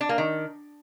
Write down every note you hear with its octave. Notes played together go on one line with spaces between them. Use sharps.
D4
A#3
D#3